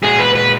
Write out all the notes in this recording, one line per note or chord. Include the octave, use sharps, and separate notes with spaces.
A#2 G#3 B3 F#4 G#4
B4
B4